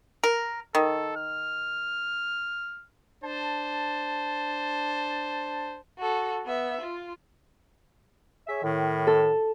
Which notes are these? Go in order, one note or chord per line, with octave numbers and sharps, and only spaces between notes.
A#4
D#3 A4
F6
D4 C5 A5
F#4 A4
B3 E5
F4
G#4 C#5 E5
A2 D#3
A4